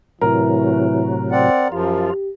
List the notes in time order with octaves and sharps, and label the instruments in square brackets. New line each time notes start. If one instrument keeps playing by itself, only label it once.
[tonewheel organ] A2 C3 F#3 [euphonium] E3 [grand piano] A#4
[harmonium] C4 D5 F#5
[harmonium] F#2 F3 [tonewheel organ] F4 [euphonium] G4